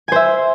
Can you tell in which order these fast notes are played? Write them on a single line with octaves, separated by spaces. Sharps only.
G#5 C5 E5